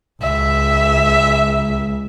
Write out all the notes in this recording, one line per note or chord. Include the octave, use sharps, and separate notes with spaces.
C#2 E5